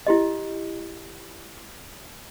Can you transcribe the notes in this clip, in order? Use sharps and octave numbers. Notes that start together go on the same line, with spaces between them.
E4 G4 D#5